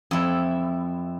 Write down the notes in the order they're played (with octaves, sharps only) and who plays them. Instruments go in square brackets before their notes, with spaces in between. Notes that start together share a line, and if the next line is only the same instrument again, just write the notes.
[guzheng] F2 E4